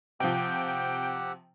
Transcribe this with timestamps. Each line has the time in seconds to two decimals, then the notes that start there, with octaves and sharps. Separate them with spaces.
0.20 C3 F3 G4 F#5 G5 E6